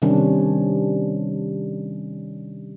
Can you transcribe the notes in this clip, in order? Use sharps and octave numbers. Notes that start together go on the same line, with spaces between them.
C3 D#3 G3 C#4 D4